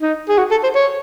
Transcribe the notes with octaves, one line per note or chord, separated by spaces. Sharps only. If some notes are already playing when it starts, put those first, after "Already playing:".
D#4
G#4
F#4
A4
C5
C#5